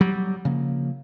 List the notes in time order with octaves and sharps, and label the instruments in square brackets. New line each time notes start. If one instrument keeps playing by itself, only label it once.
[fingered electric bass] F#3 G3
C#3 F3 A#3